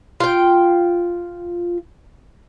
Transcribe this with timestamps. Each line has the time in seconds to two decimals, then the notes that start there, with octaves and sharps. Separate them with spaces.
0.20 F4 G5